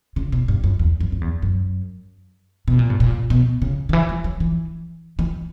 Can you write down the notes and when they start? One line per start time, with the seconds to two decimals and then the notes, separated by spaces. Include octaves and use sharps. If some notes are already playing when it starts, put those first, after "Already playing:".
0.16 C#3
0.32 B2
0.48 G2
0.64 F#2
0.79 E2
1.00 F#2
1.12 F#2
1.21 E2
1.42 F#2
2.68 B2
2.79 A#2
2.90 G2
3.00 A#2
3.30 B2
3.62 C#3
3.89 D3
3.93 E3
4.09 G3
4.24 F#3
4.40 E3
5.19 E3